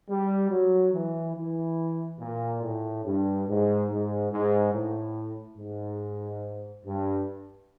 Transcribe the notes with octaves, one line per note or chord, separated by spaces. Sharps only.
G3
F#3
E3
E3
A#2
A2
G2
G#2
G#2
G#2
A2
G#2
G2